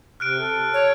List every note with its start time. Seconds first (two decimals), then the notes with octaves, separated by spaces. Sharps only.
0.20 C3 F6 F#6 D7
0.39 A4
0.74 C#5